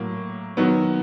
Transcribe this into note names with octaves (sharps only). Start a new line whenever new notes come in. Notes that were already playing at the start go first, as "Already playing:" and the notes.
Already playing: A2 F#3 A#3
D#3 F#3 B3